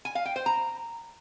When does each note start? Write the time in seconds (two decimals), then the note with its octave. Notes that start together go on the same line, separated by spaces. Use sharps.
0.05 G#5
0.15 F5
0.25 G5
0.36 C5
0.46 A#5